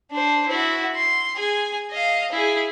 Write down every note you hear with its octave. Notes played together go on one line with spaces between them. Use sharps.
D4 C5
E4 F#4
C6
G#4 G#5
D#5 F5
E4 G#4